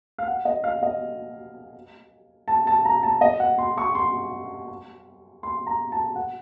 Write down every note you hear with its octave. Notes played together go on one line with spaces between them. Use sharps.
F5
F#5
D#5
F5
D#5
A5
A5
A#5
A5
D#5
F#5
C6
C#6
C6
C6
A#5
A5
F#5